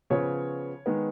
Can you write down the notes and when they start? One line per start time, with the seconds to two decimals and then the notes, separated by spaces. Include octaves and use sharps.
0.10 C#3 F3 B3 C#5
0.86 D#3 G#3 B3